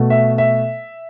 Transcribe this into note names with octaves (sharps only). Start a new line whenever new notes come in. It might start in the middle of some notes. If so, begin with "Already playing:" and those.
Already playing: B2 A3
E5
E5